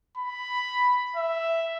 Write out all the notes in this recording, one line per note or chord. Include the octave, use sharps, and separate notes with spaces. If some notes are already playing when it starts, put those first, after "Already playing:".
B5
E5